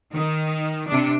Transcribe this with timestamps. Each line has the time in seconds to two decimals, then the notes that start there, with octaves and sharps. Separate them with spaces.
0.14 D#3
0.89 C3 D4